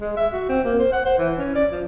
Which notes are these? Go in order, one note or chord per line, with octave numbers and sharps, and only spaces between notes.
G#3
E5
F#4
C4
A#3
C5
F#5
C5
E3
C#4
D5
F3